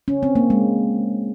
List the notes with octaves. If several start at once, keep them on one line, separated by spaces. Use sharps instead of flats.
C#4
C4
A#3
G#3